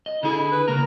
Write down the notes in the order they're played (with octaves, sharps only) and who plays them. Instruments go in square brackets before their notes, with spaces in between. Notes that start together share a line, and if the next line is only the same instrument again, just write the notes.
[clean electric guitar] D#5
[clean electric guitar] D3 G#4 [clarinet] E4
[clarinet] B4
[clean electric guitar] C#3 A#3 A#4 [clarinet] A#5